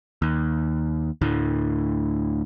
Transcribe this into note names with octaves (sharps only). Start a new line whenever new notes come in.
D#2
D2 A2